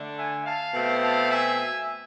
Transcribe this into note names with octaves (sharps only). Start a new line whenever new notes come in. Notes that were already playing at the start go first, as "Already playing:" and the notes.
Already playing: D3 A3 D4
E5 G#5
F5 A5
B2 A3 C4
F5 A5
E5 G#5